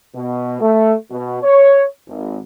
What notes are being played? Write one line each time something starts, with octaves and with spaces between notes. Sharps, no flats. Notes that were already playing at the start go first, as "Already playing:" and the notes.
B2
A3
B2
C#5
G#1